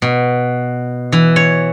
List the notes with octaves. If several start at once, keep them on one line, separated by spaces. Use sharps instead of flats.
B2
E3
C#5